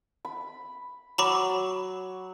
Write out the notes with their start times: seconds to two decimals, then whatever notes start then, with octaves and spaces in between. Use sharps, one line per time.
0.25 B5
1.18 F#3 A#5 B5 D6